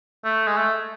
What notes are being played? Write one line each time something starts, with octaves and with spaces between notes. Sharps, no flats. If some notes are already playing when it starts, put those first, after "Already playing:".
A3
G#3
A3